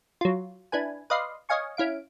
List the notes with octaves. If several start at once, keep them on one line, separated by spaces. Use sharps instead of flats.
F#3 F4
D4 E4 B4 G#5
B4 D5 D#5 F5 C6
C#5 D#5 F5 G#5 C#6
C#4 E4 F5 D7